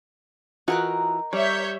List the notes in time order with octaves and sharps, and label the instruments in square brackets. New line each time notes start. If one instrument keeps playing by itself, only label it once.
[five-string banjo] E3 F4 F#4 [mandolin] D#4 A#4 F#6
[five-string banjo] G3 [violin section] C#5 E5 G6